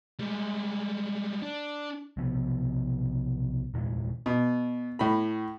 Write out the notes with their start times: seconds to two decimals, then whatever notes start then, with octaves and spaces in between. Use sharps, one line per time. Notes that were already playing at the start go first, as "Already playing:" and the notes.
0.19 G3 G#3
1.42 D4
2.17 B1 C3 F3 B3
3.74 E2 A#2 E3 G#3
4.26 B2
4.99 A2 B5